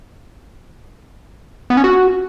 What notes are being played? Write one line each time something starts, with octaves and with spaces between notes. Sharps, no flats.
B3
C#4
F#4